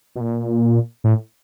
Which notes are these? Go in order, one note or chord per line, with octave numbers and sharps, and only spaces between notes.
B2
A#2
A2